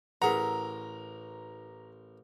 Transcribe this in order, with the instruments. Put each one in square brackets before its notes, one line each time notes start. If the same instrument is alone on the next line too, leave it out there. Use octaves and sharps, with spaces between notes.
[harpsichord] A1 A#4 [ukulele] E4 G#4 F#5 [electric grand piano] A#5